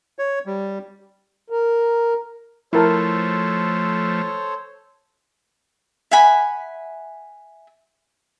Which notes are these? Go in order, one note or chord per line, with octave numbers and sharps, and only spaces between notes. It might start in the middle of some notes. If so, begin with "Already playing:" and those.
C#5
G3
A#4
F3 A3 E4 A4 A#4 C5 C#5 A5
E5 F#5 G#5 B5